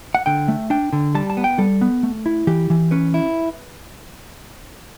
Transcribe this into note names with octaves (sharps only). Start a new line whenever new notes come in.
F#5
D3 G5
A3
D4 G5
D3
G3 A5
A5
B3
G5
G3 A4
B3
A3
E4
E3 G4
E3
C#4 B4
E4